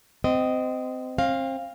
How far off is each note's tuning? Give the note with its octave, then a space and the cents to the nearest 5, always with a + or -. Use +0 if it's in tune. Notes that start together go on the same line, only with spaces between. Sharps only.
C4 -25 D#5 +0
C4 +35 F5 +0